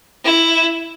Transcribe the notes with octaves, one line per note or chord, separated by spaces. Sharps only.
E4